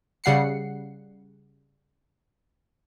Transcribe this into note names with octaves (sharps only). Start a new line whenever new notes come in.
C#3 G3 F#5 C7 C#7